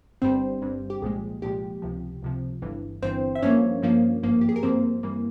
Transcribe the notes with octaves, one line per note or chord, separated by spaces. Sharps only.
G1 G2 G3 C4 C5
G1 G2 G3
G4
C2 A#2 F3 G#3 G#4
C2 A#2 F3 G#3 G4
C#2 C3 F3
C#2 C3 F3
G1 G2 E3
G1 G2 E3 C4 C5
E5
G2 F3 A#3 C#4 C#5
G2 F3 A#3
G#1 G2 F3 A#3
G4
G#4
A#4
G#1 G2 F3 A#3 C4 C5
G2 E3 G3 A#3